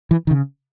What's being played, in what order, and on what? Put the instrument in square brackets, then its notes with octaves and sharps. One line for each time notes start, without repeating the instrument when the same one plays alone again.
[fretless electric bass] E3
D#3
C#3